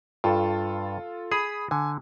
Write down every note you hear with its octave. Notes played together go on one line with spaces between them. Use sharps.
G2 F4 A4
G#4 B5 D#6
D3 G#5